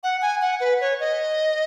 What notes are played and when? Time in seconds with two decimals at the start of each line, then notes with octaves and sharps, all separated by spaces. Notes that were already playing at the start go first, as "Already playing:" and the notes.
0.03 F#5
0.22 G#5
0.42 F#5
0.60 B4
0.81 C#5
1.00 D#5